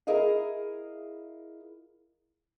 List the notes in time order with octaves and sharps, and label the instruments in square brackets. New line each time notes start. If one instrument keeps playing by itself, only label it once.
[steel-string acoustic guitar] E4 G#4 A#4 D#5 F5